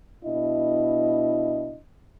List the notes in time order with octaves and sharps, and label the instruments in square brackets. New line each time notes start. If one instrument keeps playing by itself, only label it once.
[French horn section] B2 D4 E4 D#5